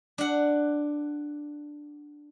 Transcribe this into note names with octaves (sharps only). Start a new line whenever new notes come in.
D4 F#5